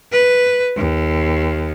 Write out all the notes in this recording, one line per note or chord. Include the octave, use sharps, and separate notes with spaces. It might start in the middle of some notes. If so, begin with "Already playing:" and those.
B4
D#2